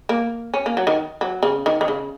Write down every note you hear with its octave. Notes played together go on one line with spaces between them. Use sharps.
A#3
C#4
A#3
F#3
D#3
F#3
C#3
D#3
D#3
C#3